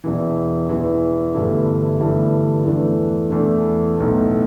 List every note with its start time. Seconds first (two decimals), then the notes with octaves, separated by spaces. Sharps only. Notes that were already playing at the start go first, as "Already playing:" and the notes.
0.04 E1 E2 E3
0.69 E1 E2 E3
1.34 G1 G2 E3 A3 E4
2.00 G1 G2 E3 A3 E4
2.64 E2 E3 A3 D4
3.30 E2 E3 A3 D4
3.96 B1 A2 A3